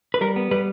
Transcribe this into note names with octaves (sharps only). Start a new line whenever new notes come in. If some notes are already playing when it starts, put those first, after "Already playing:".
B4
G3 A#4
B3
G3 B4